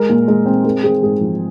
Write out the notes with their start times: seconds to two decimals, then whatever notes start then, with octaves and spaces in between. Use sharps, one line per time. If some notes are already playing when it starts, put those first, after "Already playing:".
Already playing: G#3 A#4
0.09 A#2
0.28 G#3
0.46 C4
0.64 G#3 A#4
0.83 C4 G#4
1.02 G#2 G#4
1.21 F3